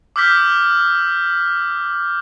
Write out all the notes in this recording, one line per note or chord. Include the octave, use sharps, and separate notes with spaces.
D6 E6 F6 G6 B6